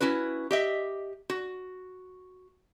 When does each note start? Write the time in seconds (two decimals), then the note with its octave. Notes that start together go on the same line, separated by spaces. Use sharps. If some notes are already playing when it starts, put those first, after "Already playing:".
0.01 C#4 E4 F#4 B4
0.51 G4 D#5 E5
1.30 F#4